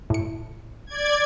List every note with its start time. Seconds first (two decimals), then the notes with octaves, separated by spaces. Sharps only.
0.10 A2 C#7
0.87 D5 G#6